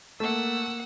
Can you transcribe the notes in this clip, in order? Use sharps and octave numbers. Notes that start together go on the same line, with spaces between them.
A3 A#3 F#5 E6